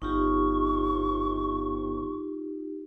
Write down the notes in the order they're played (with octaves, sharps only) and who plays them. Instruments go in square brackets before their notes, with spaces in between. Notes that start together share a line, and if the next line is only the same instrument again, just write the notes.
[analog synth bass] G1 [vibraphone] D#4 F4 G4 [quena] C#6